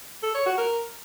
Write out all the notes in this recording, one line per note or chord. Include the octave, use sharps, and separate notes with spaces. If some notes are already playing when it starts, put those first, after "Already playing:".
A4
C#5
F#4
A#4